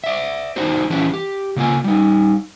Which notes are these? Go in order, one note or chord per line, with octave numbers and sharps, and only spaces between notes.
D5 E5
D4 D#4 F#4 C5
E3 C#4 D4 E4 F#4 G4
G4
C#3 A#3 F4 G#5
G3 D#4